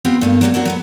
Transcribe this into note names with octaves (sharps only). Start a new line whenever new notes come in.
B3 C4 F4 G4 B4 C5
G2 A3 A#3
F#3 G3 A#3 B3 F#4
A#3 C4 D4 F#4
F#3 A3 B3